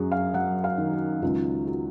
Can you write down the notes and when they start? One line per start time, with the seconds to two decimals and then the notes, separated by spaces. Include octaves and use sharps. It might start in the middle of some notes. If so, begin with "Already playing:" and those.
Already playing: F#2 F#3 F#4 G#4
0.12 F5
0.34 F#3 F#5
0.64 F5
0.78 D#3
0.93 F#4
1.22 C#2 F4
1.67 F#4